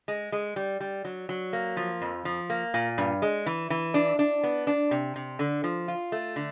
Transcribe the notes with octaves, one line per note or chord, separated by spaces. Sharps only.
G#3
G#3
G3
G3
F#3
F#3
A#3
F3
F2
F3
A#3
A#2
G2
G#3
E3
E3
D4
D4
B3
D4
C3
C3
D3
F3
F4
A3
D3